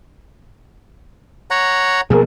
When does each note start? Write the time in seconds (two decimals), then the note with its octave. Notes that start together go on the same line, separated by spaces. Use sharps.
1.50 C#5 F#5 A#5
2.10 B2 F3 A#3 G#4 A#4